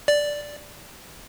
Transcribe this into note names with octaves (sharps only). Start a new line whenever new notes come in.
D5